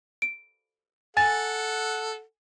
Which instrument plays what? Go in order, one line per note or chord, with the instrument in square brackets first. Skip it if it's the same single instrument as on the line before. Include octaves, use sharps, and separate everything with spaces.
[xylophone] D7
[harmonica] A4 F#5 [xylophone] G#5 A6